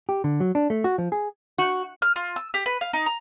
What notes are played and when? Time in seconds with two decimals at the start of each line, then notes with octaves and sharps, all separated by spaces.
0.09 G4
0.24 D3
0.40 F#3
0.55 D4
0.70 A3
0.84 F#4
0.98 F3
1.12 G#4
1.58 F#4
2.02 F6
2.16 F4
2.36 E6
2.54 G4
2.66 B4
2.81 F5
2.93 D#4
3.06 A#5